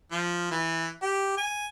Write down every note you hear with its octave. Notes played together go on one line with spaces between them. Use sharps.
F3
E3
G4
G#5